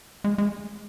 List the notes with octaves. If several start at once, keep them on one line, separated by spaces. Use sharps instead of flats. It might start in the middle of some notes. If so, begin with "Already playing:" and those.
G#3
G#3